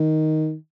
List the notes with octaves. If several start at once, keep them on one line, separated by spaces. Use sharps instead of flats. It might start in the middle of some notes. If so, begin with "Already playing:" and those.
Already playing: D#3